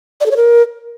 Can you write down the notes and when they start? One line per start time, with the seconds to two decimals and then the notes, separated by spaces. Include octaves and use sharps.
0.20 D5
0.26 A4
0.31 C#5
0.36 A#4